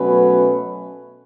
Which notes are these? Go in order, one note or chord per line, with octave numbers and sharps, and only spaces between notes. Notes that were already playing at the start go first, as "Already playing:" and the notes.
Already playing: B2 F#3 A3 C#4 B4